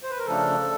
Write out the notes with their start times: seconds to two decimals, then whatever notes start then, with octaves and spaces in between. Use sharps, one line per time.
0.03 C5
0.11 B4
0.19 A#4
0.26 C#3 F3 A3 D4 A4